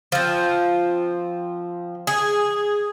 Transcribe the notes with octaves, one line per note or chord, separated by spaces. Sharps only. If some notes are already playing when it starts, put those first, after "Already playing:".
F3 C4
G#4